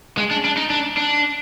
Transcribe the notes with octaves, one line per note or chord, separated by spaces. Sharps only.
G#3
D4
D4
D#4
D4
D4